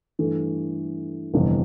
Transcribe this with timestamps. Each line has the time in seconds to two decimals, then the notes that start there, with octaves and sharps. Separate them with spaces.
0.19 G2 E3 A3
1.34 G1 F2 C3 E3